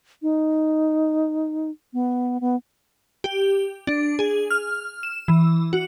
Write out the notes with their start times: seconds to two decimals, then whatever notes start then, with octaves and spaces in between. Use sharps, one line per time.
0.22 D#4
1.93 B3
2.41 B3
3.24 G4
3.87 D4
4.19 G#4
4.51 F6
5.03 E7
5.28 E3
5.73 F#4